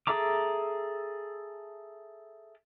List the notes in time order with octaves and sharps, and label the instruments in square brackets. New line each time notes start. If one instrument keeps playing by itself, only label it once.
[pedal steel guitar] G#4 A4 E5 A#5 D6